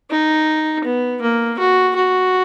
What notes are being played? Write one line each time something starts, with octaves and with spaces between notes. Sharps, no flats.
D#4
B3
A#3
F#4
F#4